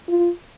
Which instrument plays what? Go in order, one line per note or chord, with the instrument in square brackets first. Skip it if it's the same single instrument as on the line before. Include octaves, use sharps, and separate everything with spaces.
[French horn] F4